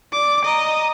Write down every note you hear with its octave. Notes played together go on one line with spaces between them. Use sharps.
D5 D6
D#5 A#5